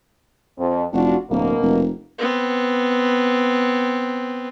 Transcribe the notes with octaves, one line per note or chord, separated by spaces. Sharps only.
F2
F1 D4 F4 F#4
D1 B2 A#3
F1
B3 C4